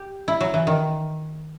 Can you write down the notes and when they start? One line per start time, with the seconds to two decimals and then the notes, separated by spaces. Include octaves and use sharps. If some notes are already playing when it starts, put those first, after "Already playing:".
Already playing: G4
0.28 E4
0.41 F#3
0.54 E3
0.67 D#3